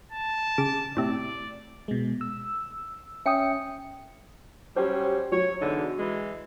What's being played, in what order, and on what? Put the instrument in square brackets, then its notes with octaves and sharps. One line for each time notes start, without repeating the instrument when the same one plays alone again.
[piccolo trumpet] A5
[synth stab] C#3 D6 E7
[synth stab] A2 C3 [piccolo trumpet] D5
[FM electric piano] B2 G#3
E6
[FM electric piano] C#4 C#7 [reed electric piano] E5 G5 D#6
[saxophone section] F#3 G3 C#4 [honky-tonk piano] G4 C5
[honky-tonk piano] F#3 [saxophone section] C#5
[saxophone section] E2 D3 D#4
E3 G#3